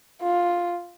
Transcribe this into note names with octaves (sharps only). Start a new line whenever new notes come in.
F4